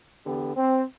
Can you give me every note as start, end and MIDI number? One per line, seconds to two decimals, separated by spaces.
0.25 0.51 40
0.25 0.51 50
0.25 0.51 59
0.25 0.51 67
0.55 0.83 60